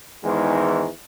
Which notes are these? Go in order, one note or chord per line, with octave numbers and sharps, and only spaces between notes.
E2 G#2 D#3 E3 G#3